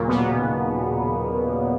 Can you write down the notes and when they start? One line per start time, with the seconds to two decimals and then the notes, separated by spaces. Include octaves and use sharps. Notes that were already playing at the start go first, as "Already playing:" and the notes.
Already playing: D#2 A#2 C#3 F#3 A#3
0.08 B2 B3